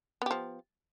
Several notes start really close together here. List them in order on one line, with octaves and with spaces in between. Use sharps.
B3 G4 F3